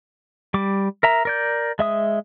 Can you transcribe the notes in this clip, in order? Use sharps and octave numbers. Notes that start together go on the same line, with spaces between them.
G3 D6
A#4 E5 A#5
A#4 D5 G6
G#3 E5 D#6